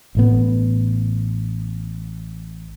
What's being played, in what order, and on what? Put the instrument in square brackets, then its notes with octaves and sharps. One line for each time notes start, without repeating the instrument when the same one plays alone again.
[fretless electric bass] A1 A2 B3